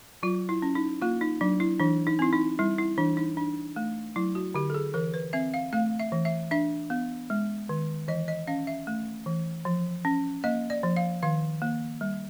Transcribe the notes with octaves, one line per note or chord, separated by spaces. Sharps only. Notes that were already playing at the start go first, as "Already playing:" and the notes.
F#3 F4
E4
C#4
D#4
A#3 F4
D#4
F#3 D4
E4
E3 D4
D#4
C4 E4
D#4
G3 E4
E4
E3 D4
D#4
D4
A3
F#3 E4
F#4
D3 G4
A4
G#4
E3 A#4
B4
C4 E5
F5
A3 F5
E5
E3
E5
D4 E5
B3
G#3
D#3
E3 D#5
D#5
C#4 F5
E5
A3
E3
F3
C#4
A#3 D#5
D5
F3
F5
D#3 F5
A#3
G3